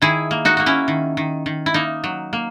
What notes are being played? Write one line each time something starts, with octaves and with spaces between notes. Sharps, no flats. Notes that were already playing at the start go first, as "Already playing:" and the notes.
D#3 E4 G#4
A#3
D#4 F#4
A#3 F#4
C#4 E4
D#3
D#3
D#3
E4
A#3 D#4
F#3
A#3